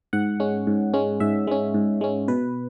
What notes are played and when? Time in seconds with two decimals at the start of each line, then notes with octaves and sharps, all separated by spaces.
0.13 G#2 F#5
0.40 G#3 C#4
0.67 G#2
0.94 G#3 C#4
1.20 G#2 E5
1.47 G#3 C#4
1.74 G#2
2.01 G#3 C#4
2.28 B2 B4